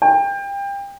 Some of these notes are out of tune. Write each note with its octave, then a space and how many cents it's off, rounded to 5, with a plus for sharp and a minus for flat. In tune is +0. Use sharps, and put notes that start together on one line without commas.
G5 +30